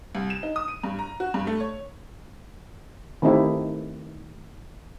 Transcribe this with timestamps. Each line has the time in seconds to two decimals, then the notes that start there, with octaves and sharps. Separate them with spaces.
0.15 C2
0.30 E7
0.43 D#4
0.56 D#6
0.68 D#7
0.83 G2
0.99 A#5
1.20 F#4
1.34 G2
1.47 A3
1.60 C#5
3.22 D#3 A3 C4 D#4 E4 G4